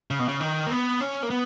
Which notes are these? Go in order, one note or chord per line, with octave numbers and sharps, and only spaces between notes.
C#3
B2
C#3
D#3
A#3
B3
C#4
A#3
B3